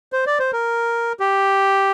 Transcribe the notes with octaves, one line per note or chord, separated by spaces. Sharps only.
C5
D5
C5
A#4
G4